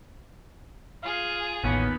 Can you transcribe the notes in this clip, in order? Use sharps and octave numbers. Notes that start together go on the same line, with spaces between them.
F4 G#4 F5
A1 D#2 B3 C#4